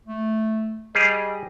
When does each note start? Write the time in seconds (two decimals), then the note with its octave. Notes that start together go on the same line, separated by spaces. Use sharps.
0.06 A3
0.95 G3 G4 G#4 D#5